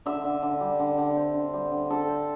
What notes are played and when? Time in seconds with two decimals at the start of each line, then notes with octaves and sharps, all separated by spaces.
0.06 D3 E5
0.24 D3
0.43 D3
0.60 G3
0.79 D3
0.98 D3
1.16 C4
1.34 D3
1.53 G3
1.71 D3
1.90 D3 A4
2.08 C4